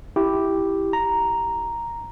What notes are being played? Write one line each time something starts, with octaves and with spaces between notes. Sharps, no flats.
E4 G4
A#5